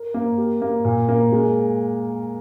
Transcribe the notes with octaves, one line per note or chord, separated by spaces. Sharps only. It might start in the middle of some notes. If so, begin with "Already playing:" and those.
Already playing: A#4
A#3
G4
A#3
A#2
A#3
G#3